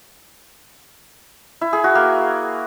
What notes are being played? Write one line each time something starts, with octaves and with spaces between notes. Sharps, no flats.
E4
G#4
F#4
A#3